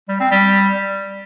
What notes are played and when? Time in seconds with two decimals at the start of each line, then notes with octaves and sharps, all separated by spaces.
0.09 G3
0.20 C4
0.31 G3